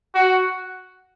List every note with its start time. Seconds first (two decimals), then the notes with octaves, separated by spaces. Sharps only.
0.14 F#4